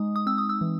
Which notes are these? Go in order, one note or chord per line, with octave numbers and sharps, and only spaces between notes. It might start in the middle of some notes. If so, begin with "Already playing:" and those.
Already playing: G#3 D#4 D#6
D#6
C4 E6
D#6
E6
E3